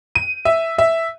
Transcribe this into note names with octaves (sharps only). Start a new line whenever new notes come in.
D#7
E5
E5